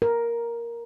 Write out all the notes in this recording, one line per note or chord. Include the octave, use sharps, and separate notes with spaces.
A#4